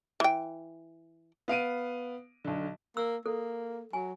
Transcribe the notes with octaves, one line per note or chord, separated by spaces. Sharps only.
E3 G5
B3 F5 D7 D#7
B1 D3
A#3 E6
A#3 A4
F#3 G#5